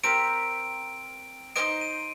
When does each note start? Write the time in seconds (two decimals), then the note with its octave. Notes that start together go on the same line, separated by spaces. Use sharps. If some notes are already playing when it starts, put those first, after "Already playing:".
0.04 C4 G4 A#4 D7
1.56 D#4 G4 C5 D#5 D7
1.81 D#7